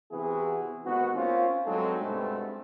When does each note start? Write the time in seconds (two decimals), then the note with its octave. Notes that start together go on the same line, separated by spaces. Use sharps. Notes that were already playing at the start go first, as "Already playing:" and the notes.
0.12 C3 E3 B3 E4 F#4 G#4
0.85 D#2 G#2 B3 F#4
1.15 A#3 C4 C#4 F4
1.66 G2 F#3 G#3 C4 D#4 A4
2.01 G2 B2 G#3 A3 B3 C4